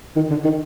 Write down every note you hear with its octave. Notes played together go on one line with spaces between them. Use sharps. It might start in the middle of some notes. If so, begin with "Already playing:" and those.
D#3
D3
D#3